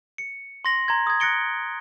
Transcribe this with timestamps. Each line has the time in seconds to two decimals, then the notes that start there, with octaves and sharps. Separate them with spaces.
0.18 C#7
0.65 C6 A#6 F#7
0.88 A#5 C6 G#6
1.07 D#6 G#6
1.20 F#6 A6 A#6 C#7 D7 G7